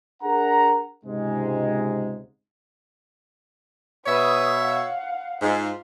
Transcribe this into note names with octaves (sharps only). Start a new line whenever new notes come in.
D4 G#4 A#4 F#5 A#5
C#2 G#2 C3 G#3
B2 B4 C#5 E5 D#6
F5 F#5
G#2 F4